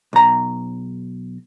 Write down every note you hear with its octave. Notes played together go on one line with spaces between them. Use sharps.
B1 A#5